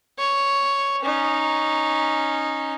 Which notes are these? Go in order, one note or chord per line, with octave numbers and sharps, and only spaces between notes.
C#5
C#4 D#4